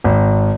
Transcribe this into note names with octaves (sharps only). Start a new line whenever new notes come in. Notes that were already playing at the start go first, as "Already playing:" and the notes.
G#1